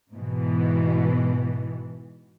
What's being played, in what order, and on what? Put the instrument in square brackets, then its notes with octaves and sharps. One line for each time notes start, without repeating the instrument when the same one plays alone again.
[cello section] G#2 B2 E3